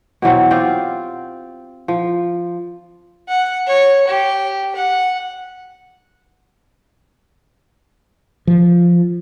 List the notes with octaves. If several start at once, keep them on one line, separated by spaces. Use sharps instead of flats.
B2 E3 F#3 C4
C4 F4 G4
F3
F#5
C#5
G4
F#5
F3